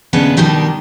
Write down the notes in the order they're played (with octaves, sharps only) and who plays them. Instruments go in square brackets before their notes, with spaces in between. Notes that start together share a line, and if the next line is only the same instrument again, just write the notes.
[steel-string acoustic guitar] D#2 C#3 B3 D4
B2 D#3 G3 D4 G4